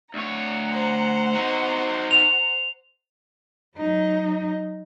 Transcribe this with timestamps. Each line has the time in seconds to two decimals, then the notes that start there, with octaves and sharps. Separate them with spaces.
0.14 D2 C#5 F#5 A#5
0.71 C5
1.34 D#4 F#4
2.11 F7
3.77 F#3 D#4